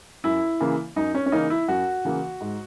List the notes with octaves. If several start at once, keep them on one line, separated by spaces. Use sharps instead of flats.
F#2 E4
C#3 E3 A#3
F#2 D#4
C#4
C#4
C#3 E3 A#3 D#4
E4
F#2 F#4
C#3 E3 A#3
G#2